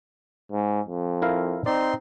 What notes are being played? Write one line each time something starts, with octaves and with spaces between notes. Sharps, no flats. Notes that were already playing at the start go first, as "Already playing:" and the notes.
G#2
F2
E4 A#4 F5
C4 D#4 D5 C6